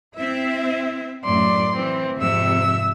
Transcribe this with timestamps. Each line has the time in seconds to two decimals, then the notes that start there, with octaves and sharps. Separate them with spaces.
0.16 C4 E4 E5
1.25 F#2 A2 D5 C6
1.76 E3 C4
2.18 F2 G#2 C3 E5 E6